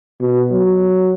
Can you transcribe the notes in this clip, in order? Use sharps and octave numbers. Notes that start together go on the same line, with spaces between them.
B2
F#3